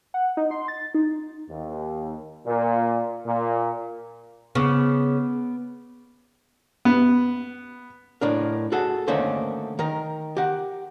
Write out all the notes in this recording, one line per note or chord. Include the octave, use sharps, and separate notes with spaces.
F#5
D#4
C6
A6
D#4
D#2
A#2
A#2
C#3 B3 D6
B3
A2 D4 A#4
F#4 G#4 A4 F#5
D3 D#3 A3 A#3 C#4 C5
D#3 A#4
G4 F#5